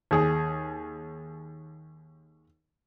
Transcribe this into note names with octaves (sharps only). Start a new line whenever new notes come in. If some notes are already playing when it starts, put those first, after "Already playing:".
D#2 G#4